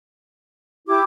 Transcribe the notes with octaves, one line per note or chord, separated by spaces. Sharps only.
E4 G4 D6